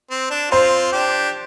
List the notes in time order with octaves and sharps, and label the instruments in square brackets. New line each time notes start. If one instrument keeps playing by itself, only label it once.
[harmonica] C4
D4
[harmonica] C4 F4 [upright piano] C5
[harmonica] D4 G4